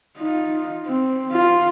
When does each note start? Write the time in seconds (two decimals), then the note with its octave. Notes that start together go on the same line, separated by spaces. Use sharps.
0.18 D#4 F4
0.86 C4
1.32 F4